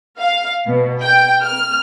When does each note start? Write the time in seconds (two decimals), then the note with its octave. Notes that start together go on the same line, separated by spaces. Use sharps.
0.18 F5
0.67 B2
1.02 G5
1.42 F6